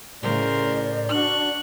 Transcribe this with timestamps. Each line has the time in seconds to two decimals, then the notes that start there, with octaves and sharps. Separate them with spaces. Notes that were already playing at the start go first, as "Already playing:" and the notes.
0.22 A2 C#3 A#4 C5 D5
1.10 D4 F#4 C#6 F#6